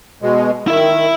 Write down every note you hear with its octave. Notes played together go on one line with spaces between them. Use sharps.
B2 G#3
D#3 E4 E5